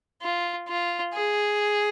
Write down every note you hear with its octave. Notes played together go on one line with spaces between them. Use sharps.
F4
F4
G#4